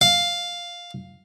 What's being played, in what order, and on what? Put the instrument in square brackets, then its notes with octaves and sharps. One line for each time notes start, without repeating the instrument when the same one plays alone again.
[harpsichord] F5